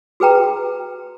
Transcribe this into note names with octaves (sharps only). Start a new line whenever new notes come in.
F#4 G#4 B4 G5 A#5